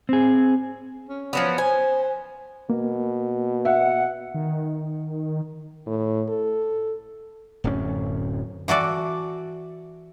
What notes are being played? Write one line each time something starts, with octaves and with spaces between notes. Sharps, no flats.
C4 G#4
C#4
F3 F#3 B3
C5 G#5
B2 A#3
E5 F#5
D#3
A2
A4
D1 F#2 A3 C#4
E3 F#4 A4 D5